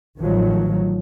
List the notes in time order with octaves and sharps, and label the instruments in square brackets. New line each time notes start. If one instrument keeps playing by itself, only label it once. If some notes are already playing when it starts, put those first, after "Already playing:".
[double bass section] A1 D#3 F3 F#3